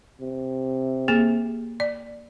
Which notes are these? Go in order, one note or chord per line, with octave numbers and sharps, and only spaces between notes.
C3
A#3 G#4
D5